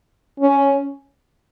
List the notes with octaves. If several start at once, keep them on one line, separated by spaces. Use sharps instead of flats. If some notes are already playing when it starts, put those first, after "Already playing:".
C#4